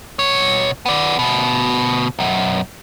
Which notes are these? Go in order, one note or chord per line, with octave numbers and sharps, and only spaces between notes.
B2 C#5
B3 D5
D2 B2
B1 F#2